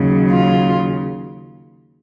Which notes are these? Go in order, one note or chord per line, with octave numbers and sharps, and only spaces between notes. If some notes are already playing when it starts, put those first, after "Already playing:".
Already playing: D#2 C#3 F#3
F4